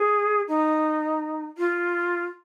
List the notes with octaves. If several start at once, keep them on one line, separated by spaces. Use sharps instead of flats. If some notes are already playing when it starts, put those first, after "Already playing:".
Already playing: G#4
D#4
F4